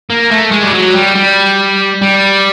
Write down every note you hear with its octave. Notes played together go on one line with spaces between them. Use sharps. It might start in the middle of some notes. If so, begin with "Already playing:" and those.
A#3
A3
G#3
G3
F#3
G3
G3
G3